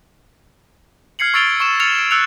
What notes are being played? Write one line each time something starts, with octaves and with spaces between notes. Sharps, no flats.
F6 G#6 C7 C#7 F#7
C#6 E6 A6 D7 F7 G7
C#6 E7
F6 A6 C#7 F7
D7 G7
E6 F#6 C#7 F7